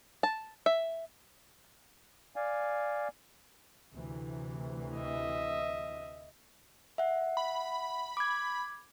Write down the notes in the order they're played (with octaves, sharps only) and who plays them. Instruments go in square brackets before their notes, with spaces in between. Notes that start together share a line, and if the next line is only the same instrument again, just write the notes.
[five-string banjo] A5
E5
[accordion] D5 F5 G#5
[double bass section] D2 C3 E3
[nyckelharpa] D#5 E5
[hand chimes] E5 F#5
[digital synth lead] B5
[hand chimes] D6 G#6